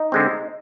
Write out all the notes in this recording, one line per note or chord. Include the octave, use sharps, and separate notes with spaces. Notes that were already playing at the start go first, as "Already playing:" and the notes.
Already playing: D#4
D3 G#3 C4